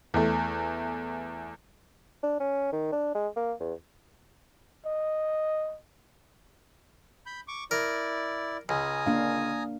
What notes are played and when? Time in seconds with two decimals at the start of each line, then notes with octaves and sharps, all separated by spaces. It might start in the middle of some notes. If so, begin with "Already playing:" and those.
0.14 E2 A3
2.23 D4
2.40 C#4
2.72 D#3
2.92 D4
3.15 G#3
3.37 A#3
3.60 E2
4.86 D#5
7.26 B5 G6
7.48 C#6 D6
7.71 E4 A#4 D5
8.69 C#2 G#5 A#5 D#6
9.06 A#3 D4 F5